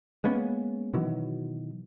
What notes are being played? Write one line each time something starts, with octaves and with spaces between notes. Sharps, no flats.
G#3 A#3 B3 C#4
B2 D#3 E3 F#3